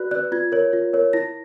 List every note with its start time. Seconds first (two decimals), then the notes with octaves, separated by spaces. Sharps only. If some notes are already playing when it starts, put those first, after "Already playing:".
Already playing: F#4 B4 D5 F#6
0.11 D5 F#6
0.15 B4
0.32 F4 G#6
0.52 A#4 C#5
0.73 F4
0.93 A#4 C#5
1.13 E4 A#6